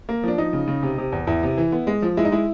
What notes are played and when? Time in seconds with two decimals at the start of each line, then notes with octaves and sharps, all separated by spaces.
0.09 A#3
0.23 F3 D4
0.38 F3 D#4
0.53 C#3
0.68 C#3
0.83 C3
0.98 C3
1.12 E2
1.27 E2 E4
1.43 C3
1.58 E3
1.72 B3
1.87 G#3
2.02 F3
2.17 G#3 E4
2.25 D#4
2.32 G#3 E4